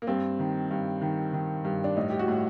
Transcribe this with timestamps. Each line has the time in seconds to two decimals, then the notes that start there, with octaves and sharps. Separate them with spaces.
0.02 A#3
0.07 G2 C4
0.39 D#3
0.71 G2
1.02 D#3
1.33 D#3
1.65 G2
1.84 D4
1.97 A2 D#4
2.10 G4
2.19 F#4
2.28 A2